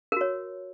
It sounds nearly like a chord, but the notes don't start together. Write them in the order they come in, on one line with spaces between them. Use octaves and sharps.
A#4 F#4 C#5